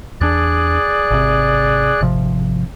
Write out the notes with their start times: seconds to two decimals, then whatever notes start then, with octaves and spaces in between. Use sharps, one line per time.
0.21 E2 D4 G#4 D5 F#6
1.11 G#1 C3
2.01 G#1 C3 F3